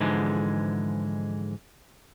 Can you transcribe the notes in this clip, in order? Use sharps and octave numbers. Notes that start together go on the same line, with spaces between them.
G#2 D3 E3 F3 G#3